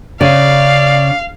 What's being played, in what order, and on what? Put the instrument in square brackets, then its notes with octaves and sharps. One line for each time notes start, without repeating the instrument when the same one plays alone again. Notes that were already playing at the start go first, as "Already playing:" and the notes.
[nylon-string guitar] C#3 [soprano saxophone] D5 [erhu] F5